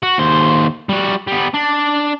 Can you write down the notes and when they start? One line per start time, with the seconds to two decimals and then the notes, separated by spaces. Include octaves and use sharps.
0.03 F#4
0.18 D#2 C5
0.89 G3 F#4
1.27 G3 B3
1.54 D4